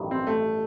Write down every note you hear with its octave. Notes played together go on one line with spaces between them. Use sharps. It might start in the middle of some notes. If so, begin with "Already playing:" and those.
Already playing: A1 G2 D#3 F#3 B3
C4
A3